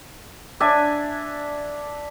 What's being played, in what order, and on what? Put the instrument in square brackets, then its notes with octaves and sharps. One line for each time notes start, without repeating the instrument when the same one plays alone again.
[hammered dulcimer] D4 E5 G#5